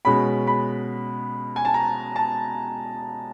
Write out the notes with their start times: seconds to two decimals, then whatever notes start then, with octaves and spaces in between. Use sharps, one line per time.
0.05 B2 G#3 C#4 B5
0.47 B5
1.56 G#5
1.65 A5
1.74 A#5
2.16 A5